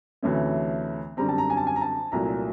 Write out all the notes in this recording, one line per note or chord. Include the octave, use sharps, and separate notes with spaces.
D2 C3 E3 A3 C#4
F#2 D3 G3 C4 A#5
A5
A#5
G#5
A5
G#5
A#5
A5
C2 A#2 F#3 A3 A#5